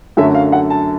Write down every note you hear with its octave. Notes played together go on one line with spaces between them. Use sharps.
F#2 D3 F#3 A3 E5
F5
F#5
A5